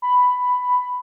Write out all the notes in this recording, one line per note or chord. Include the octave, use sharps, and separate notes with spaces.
B5